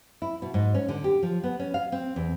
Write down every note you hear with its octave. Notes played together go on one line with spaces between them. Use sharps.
E4
B2
G#2
C#4
D3
G4
F3
B3
C#4
F5
C4
E2